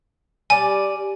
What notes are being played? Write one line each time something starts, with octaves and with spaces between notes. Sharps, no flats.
G3 D5 G#5